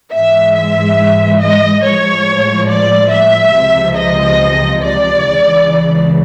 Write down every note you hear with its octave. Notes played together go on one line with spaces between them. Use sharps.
G#2 E3 G#3 E5
E5
D#5
A2 F3 G#3 C#5
D5
E5
C#2 C3 F3
D#5
D5
C#2 C#3 E3